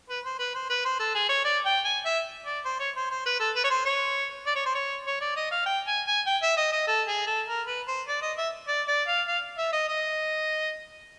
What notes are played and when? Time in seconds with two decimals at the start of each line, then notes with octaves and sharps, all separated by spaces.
0.10 B4
0.25 C5
0.39 B4
0.55 C5
0.70 B4
0.85 C5
1.00 A4
1.15 G#4
1.29 C#5
1.45 D5
1.65 G5
1.85 G#5
2.05 E5
2.45 D5
2.65 C5
2.80 C#5
2.96 C5
3.11 C5
3.26 B4
3.40 A4
3.56 B4
3.64 C#5
3.70 C5
3.85 C#5
4.47 D5
4.55 C#5
4.66 C5
4.75 C#5
5.07 C#5
5.21 D5
5.36 D#5
5.51 F5
5.66 G5
5.87 G#5
6.07 G#5
6.27 G5
6.42 E5
6.57 D#5
6.72 D#5
6.87 A4
7.08 G#4
7.26 A4
7.48 A#4
7.67 B4
7.88 C5
8.08 D5
8.22 D#5
8.38 E5
8.68 D5
8.88 D5
9.07 F5
9.28 F5
9.58 E5
9.73 D#5
9.88 D#5